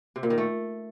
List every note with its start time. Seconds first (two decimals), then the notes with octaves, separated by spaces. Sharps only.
0.16 C3
0.23 A#2
0.30 D#3
0.38 A3